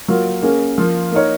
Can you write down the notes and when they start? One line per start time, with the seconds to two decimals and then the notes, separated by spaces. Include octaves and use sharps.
0.08 F#3 A#3 F4
0.42 A#3 C#4 G#4
0.77 F3 A#3 F4
1.12 A#3 D#4 A#4 C#5